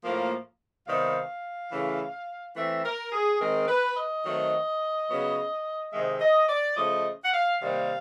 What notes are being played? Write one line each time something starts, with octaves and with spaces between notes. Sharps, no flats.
A2 F3 A#3
C3 D#3 G3 B3 F5
C#3 E3 A3
E3 A3 C4 E5
A#4
G#4
D#3 G#3 C4 A#4
B4
D#5
D#3 F#3 A3 C4
C#3 F#3 B3
C3 D#3 G#3 E5
D#5
D5
C#3 F3 A3 D#5
F#5
F5
C3 D#3 G3 A#3 F5